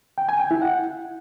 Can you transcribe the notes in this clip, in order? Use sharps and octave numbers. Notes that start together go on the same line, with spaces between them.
G5
G#5
G5
E4
F#5